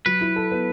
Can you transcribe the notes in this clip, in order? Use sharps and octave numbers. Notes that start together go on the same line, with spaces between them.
F#3 B4
E4
A4
B3